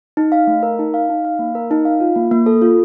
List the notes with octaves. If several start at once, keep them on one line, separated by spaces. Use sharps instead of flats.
D#4
F5
A3
A#4
D#4
F5
D#4
F5
A#3
A#4
D#4
F5
F4
A#3
A#3
A4
F4